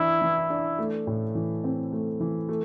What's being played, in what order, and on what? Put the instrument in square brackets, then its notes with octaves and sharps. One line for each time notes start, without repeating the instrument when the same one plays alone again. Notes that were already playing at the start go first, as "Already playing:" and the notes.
Already playing: [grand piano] E3 D4 [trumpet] E4
[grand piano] E3
D4
A3
A2
E3
C4
A3
E3
A3